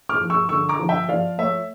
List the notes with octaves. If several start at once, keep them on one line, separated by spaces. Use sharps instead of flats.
D6 F6
F3
C#6 E6
D3 C#6 E6
A#5 D6
F3
E5 G5
F3 D5 F5
A3 C#5 E5